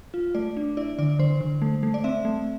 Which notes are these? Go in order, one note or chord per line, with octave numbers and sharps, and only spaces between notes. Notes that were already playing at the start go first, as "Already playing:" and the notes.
F4
A3 D5
D4
E4 D5
D3 D5
D3 C5
D3
A3
A3
D5
C4 E5
A3